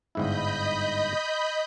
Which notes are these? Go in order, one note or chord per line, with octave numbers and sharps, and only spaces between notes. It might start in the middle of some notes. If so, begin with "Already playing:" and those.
G1 G#2 E4 D#5 B5 G6